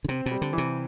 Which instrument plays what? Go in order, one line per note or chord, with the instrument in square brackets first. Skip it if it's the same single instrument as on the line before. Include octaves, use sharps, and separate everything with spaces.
[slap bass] D3
[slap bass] C3 [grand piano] C4
[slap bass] B2
[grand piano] G3
[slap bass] D3
[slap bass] C3 [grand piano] E3